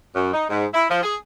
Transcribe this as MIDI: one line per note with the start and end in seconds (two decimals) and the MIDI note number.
0.15 0.31 42
0.34 0.46 63
0.50 0.66 44
0.74 0.86 64
0.90 1.02 53
1.03 1.16 68